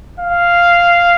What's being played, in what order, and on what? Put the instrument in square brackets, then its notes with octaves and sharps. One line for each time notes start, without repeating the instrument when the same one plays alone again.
[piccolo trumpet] F5